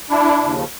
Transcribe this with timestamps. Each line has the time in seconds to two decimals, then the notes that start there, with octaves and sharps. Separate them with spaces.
0.10 D4 E4
0.42 D#2 C#3 F3